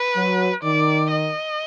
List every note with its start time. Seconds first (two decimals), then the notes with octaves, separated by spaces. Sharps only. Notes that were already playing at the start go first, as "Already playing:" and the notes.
Already playing: B4
0.15 F#3
0.63 D#3 D5
1.11 D#5